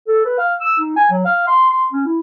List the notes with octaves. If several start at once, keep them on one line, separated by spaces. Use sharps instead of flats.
A4
B4
F5
E6
D#4
G#5
F#3
F5
C6
C6
C#4
E4